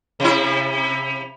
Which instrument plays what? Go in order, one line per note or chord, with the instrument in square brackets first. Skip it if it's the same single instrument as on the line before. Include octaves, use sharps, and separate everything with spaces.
[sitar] C3 E4